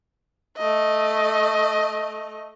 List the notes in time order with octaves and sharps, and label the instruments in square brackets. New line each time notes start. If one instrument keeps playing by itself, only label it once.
[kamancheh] A3 D#5